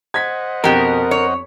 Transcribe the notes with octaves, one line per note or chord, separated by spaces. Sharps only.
C5 D#5 F#5 G#6 B6
F2 B2 G4 A#4
C#5